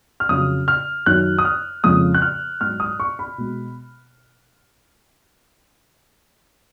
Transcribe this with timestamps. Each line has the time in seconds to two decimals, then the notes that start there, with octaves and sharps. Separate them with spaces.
0.20 F6
0.29 F2 C#3 F#3 D#6
0.68 F6
1.06 F#2 D#3 F#3 F#6
1.39 D#6
1.45 F6
1.84 F2 C#3 F3 G#3 D#6
2.14 F#6
2.22 F6
2.61 G#2 F#3 F6
2.80 D#6
3.00 C#6
3.19 B5
3.38 B2 G#3